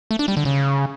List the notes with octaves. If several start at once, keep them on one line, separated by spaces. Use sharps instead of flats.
A3
D4
G3
D3
C#3